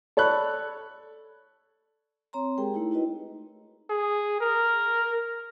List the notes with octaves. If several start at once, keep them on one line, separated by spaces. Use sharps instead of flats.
A4 C#5 D5 B5 F#6
C4 C#5 A#5 C6
G#3 G4 G#4 A#4 G5
A3 D#4 E4
D#4 E4 F#4 B4 D#5
G#4
A#4